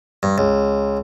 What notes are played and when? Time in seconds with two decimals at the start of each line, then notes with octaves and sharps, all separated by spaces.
0.23 G2
0.38 C#2